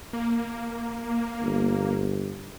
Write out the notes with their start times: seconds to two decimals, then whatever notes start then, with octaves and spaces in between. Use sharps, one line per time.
0.13 A#3
1.43 G1